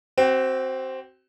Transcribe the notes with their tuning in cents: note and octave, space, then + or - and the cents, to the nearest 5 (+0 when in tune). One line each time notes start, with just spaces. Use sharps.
C4 +0 F#4 +35